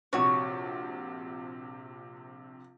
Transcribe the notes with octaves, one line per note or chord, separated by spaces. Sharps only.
A#1 C3 F#4 C#5